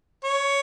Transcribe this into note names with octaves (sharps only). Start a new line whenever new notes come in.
C#5